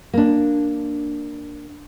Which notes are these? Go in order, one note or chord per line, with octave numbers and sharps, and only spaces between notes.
A#3 D4